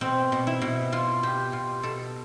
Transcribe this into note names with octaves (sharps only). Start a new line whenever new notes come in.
B2 C4
B2
E4
B2
B2 F4
B2 G4
B2 F4
B2 A4